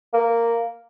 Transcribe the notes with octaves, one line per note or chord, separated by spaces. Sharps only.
A#3